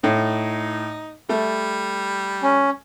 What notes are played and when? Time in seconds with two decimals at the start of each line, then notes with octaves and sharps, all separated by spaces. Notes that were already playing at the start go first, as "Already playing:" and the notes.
0.04 A2 D#4
1.29 G3 A3
2.43 C#4